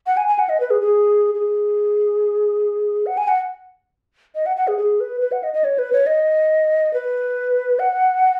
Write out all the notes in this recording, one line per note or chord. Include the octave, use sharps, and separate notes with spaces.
F#5
G#5
G#5
F#5
D#5
B4
G#4
G#4
G#4
F#5
G#5
F#5
D#5
F#5
F#5
G#4
G#4
B4
B4
F#5
D#5
D#5
C#5
B4
C#5
D#5
B4
F#5